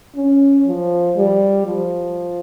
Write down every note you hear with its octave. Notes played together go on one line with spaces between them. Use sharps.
C#4
F3
G3
F3